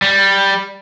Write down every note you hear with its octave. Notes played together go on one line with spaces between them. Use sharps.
G3